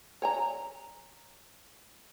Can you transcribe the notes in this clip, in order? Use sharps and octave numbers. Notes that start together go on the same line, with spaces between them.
C#5 G#5 A#5